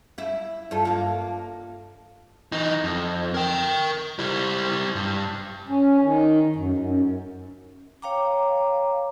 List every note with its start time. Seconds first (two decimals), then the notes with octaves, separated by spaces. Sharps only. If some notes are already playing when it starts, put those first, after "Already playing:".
0.18 E4 E5
0.71 G2 F4 A4
0.85 G2 A#3
2.52 E3 D#4
2.84 F2
3.34 A#4 G5
4.19 G3 E4
4.95 G2
5.69 C#4
6.02 D#3
6.56 F#2
6.78 F#2
8.02 C#5 F5 G5 A#5 D6